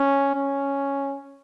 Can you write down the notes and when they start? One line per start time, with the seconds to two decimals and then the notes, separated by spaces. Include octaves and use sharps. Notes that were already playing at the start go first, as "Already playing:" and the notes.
Already playing: C#4
0.35 C#4